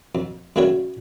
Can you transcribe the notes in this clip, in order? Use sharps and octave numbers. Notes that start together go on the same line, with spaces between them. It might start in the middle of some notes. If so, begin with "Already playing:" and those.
F2
F#2 C#3 G3 A3 F#4 C#5